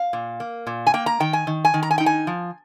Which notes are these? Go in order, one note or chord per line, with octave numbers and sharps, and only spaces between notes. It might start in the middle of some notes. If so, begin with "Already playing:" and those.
Already playing: F5
A#2
A#3
A#2
G#5
A#3 G5
A#5
D#3 G5
G#5
D#3
G#5
D#3
A#5
G#5
D#4 G5
G#5
F3